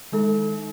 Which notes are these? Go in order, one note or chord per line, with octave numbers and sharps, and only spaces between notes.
D#3 G#3 D#4 A4